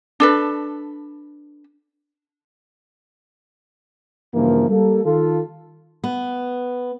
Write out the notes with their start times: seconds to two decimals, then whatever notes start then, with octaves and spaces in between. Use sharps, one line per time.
0.20 D4 A4 B4
4.34 G2 C#3 E3 F3 A#3
4.70 G3 A#3 A4
5.04 D#3 F4 A4
6.04 B3